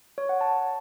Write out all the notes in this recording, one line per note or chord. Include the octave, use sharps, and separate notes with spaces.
C#5
F#5
A5